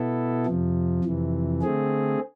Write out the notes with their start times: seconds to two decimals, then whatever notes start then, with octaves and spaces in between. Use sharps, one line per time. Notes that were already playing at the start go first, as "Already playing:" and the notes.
Already playing: B2 B3 E4 A4
0.46 F2 C3 F3
1.04 F2 C3 E3
1.62 D3 A3 C4 G#4